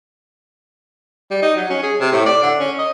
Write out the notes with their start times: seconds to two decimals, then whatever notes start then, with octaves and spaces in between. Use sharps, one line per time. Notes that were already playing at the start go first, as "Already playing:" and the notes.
1.31 G3
1.43 D#4
1.57 F#3
1.70 C#4
1.83 G#4
2.01 C3
2.12 A2
2.26 D5
2.43 D3
2.60 C#4
2.78 D#5